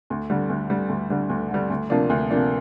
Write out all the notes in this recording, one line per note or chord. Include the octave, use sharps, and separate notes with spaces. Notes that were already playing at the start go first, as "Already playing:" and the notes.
D2
D3 G3
D2
D3 G3
D2
D3 G3
D2
D3 G3
D2
C3 F3 A#3 D4
D2
C3 F3 A#3 D4